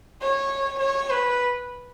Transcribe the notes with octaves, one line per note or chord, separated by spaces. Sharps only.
C#5
C#5
B4